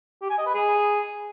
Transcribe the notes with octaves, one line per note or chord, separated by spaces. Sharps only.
G4
G#5
D#5
B4
G#4